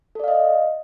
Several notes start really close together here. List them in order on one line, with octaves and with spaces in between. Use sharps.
A4 D5 F5 D#5